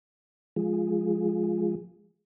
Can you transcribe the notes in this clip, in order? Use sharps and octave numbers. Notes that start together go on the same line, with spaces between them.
F3 G#3